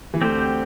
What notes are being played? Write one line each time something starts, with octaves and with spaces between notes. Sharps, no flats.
E3
D2 D3 C4 G4 C5